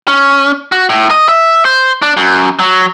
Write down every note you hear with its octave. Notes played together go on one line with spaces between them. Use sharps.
C#4
F#4
A2
D#5
E5
C5
D4
F#2
F#3